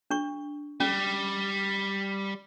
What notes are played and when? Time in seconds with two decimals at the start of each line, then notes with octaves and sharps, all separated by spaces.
0.10 D4 C#6
0.80 G3 C#4